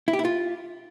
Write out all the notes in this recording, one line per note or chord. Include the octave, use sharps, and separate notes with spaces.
E4
G4
E4
F4